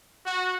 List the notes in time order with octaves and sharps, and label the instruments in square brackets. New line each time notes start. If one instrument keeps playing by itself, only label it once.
[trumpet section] F#4